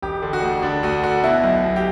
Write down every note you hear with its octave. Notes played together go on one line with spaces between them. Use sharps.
E1 G4
D3
F#4
D2
D3 D4
D2 F#4
D3 F#4
B2 E4
B1
B2
G4